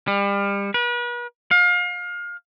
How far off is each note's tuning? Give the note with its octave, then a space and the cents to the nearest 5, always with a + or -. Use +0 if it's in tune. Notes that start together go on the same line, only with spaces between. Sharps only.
G3 +35
B4 -40
F5 +30